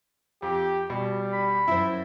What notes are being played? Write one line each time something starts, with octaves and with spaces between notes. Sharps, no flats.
F2 G4
B2 G3
B5
F#2 E4 C5 E5